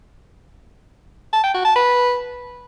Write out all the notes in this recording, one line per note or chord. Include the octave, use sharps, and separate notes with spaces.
A5
G5
F#4
A5
B4